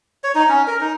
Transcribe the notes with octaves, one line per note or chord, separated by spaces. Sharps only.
C#5
D#4
C#4
A#4
D#4